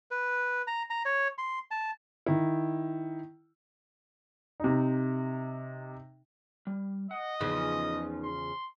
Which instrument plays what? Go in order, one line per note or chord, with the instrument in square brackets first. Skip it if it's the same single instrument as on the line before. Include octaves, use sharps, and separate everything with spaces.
[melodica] B4
A#5
A#5
C#5
C6
A5
[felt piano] D#3 E4
[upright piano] C3 D#4
[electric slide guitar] G3
[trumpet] D#5 [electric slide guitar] F#5
[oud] E2 C#3 F3 [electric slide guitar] B3 D#4 B4
[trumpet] C6